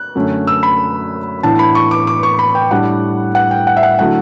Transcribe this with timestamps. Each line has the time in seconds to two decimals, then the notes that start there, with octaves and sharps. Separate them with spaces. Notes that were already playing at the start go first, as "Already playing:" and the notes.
Already playing: F#6
0.15 F#2 D3 A3 C#4
0.47 E6
0.63 B5
1.43 A2 E3 B3 D4 A5
1.59 B5
1.75 C#6
1.91 D6
2.07 D6
2.23 C#6
2.39 B5
2.55 G5
2.71 A2 G3 D4 F#5
3.35 F#5
3.51 G5
3.67 F#5
3.77 E5
3.83 F#5
3.99 D3 F#3 A3 E4 F#5